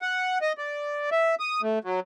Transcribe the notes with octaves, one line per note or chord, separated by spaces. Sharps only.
F#5
D#5
D5
E5
D#6
A3
F#3